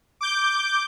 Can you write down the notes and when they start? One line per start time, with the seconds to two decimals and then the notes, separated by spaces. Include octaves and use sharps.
0.21 D6 G6